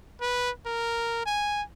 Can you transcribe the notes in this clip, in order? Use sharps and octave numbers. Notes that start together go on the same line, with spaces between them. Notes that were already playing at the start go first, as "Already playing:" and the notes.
B4
A#4
G#5